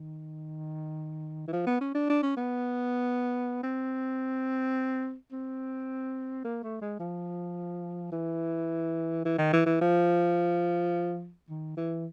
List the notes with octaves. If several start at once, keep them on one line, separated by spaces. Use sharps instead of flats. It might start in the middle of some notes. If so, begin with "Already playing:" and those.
Already playing: D#3
E3
F3
B3
C#4
D4
D4
C#4
B3
C4
C4
A#3
A3
G#3
F3
E3
E3
D#3
E3
E3
F3
D#3
E3